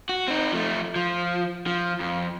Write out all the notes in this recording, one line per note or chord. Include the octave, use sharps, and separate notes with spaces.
F#4
C4 D#4
F3 A3
F3
F3
F2